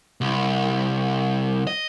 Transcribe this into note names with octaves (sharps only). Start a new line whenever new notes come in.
C2
D#5